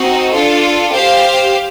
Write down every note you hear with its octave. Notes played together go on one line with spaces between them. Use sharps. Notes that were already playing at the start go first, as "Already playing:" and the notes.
Already playing: C4 D#4 F#4
D4 F4 A4
G4 C5 F5